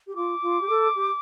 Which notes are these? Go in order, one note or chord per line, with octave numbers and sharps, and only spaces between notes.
G4
F4 D6
F4
G4
A4
G4